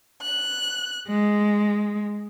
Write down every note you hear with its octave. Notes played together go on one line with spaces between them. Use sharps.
F#6
G#3